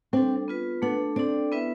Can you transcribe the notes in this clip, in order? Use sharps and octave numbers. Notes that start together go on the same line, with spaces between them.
G3 C4 D4 A4
B3 F4 B4
A3 B3 D4 A4
C4 D4 A4 D5
B3 E4 B4 E5